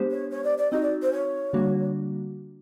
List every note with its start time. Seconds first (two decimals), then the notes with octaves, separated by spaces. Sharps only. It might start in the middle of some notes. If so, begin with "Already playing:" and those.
Already playing: G#3 B3 D4 G4 C5
0.11 C#5
0.31 C#5
0.44 D5
0.58 D5
0.72 C4 D#4 F#4 D#5
0.83 D5
1.02 C5
1.13 C#5
1.53 D3 G3 A#3 D4 F#4